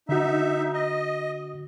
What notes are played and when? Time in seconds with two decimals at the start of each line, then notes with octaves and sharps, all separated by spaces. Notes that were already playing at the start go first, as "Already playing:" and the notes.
0.09 D3 D#4 F#4 E5
0.73 D#5